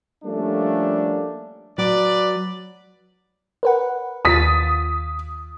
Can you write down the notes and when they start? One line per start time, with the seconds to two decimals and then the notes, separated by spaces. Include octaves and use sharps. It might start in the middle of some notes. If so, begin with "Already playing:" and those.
0.25 F3 G3 A3 A#3 C#4 D4
1.78 F#3 B4 D5
3.63 A#4 B4 F#5
4.25 D#2 F4 D#6 A6 B6